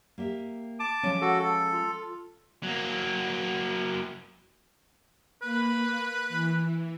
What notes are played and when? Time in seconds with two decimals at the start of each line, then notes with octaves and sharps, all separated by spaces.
0.18 A#3 G4 E5
0.80 A5 D6
1.03 F3 G#3 C#4
1.22 F#4 A4
1.39 A4
1.73 F4
2.63 F#3 A#3
5.42 A#3 B4 B5
6.29 E3